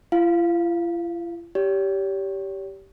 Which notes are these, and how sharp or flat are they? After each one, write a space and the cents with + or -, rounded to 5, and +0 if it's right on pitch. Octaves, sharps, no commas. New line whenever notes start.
F4 -45 F5 +0
G4 -10 C#5 +40